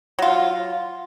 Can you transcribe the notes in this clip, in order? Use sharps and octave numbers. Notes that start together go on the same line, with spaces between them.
F#3 F4